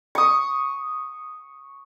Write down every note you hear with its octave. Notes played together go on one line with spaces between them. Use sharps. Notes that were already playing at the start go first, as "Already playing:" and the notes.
C#6 D#6